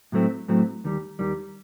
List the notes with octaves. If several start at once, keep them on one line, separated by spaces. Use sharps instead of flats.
A2 F#3 A3 C4
A2 F#3 A3 C4
D#2 D#3 G3
D#2 D#3 G3